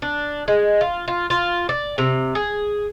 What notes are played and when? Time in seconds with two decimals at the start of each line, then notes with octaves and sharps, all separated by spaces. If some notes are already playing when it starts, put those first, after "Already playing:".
0.02 D4
0.48 G#3
0.81 F4
1.08 F4
1.30 F4
1.69 D5
1.98 C3
2.35 G#4